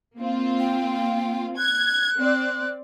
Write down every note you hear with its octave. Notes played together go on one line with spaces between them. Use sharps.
A#3 C4 F4
G5
F#6 G#6
C4 D5